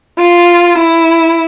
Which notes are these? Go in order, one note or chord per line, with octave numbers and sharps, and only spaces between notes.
F4
E4